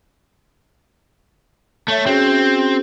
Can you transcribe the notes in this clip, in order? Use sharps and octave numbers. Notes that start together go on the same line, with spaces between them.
A3 A4 C#5 E5
C4 C#4 F#4 G#4